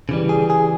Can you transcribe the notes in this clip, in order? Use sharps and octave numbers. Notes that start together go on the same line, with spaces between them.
C#3 E3 G3
G#4
G#4